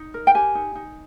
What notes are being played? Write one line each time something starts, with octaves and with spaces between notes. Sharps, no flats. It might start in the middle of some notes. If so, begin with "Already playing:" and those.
Already playing: D#4
A#4
G5
G4 G#5
D#4
D#4